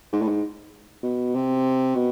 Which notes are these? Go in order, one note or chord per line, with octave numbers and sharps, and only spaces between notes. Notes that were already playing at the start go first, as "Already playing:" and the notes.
G#2
A2
G#2
B2
C3
B2